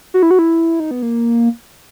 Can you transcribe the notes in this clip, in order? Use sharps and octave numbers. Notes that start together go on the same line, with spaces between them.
F#4
E4
F#4
E4
D#4
B3
A#3